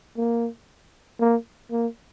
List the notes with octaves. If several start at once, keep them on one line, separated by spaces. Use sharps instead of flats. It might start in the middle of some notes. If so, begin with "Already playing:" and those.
A#3
A#3
A#3